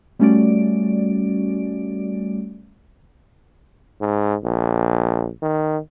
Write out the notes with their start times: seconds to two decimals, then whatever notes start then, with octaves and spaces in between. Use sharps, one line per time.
0.19 G3 A3 C#4 F#4 D5 D7
4.01 G#2
4.44 A#1
5.42 D#3